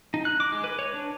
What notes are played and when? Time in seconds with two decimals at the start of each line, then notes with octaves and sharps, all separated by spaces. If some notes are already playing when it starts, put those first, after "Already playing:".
0.14 D#4
0.25 F#6
0.40 D6
0.52 G#3
0.64 B4
0.79 C#5
0.94 D4